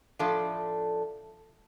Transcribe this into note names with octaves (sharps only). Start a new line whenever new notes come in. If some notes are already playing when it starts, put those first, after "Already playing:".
A2 F3 A3 D4 A4